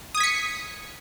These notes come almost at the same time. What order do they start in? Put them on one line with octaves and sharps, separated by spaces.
D#6 G#6 B6 C#7